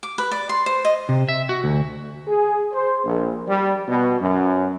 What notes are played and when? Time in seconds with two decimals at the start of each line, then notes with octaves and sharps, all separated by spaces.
0.03 D6
0.18 B4
0.31 D5
0.49 C6
0.66 C5
0.85 D#5
1.09 C3
1.29 E5
1.49 F#4
1.64 D2
2.28 G#4
2.73 C5
3.05 A#1
3.48 G3
3.88 B2
4.21 F#2